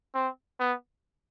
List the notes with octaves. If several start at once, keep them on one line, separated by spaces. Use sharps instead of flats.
C4
B3